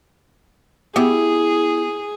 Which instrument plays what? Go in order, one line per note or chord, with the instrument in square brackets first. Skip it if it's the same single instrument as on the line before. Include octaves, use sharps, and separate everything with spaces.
[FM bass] B3 [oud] E4 G4 [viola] G#4